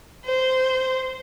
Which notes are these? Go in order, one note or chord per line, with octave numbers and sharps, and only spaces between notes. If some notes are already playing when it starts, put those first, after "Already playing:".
C5